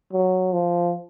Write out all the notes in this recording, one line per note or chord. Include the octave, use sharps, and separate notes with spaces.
F#3
F3